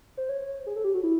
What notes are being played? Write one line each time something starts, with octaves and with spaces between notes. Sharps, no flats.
C5
C#5
G#4
A4
G4
F#4
E4